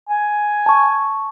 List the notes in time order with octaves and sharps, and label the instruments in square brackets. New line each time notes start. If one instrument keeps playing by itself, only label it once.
[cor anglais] G#5
[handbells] A5 C#6